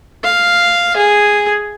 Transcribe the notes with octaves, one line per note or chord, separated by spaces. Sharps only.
F5
G#4